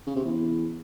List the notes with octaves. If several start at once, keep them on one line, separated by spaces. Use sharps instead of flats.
C#3
C3
E2